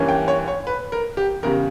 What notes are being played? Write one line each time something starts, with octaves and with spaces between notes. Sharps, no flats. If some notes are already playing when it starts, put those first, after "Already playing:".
Already playing: G2 E3 A#3 C#4
G5
C#5
C#5
B4
A#4
G4
E2 C#3 G3 A#4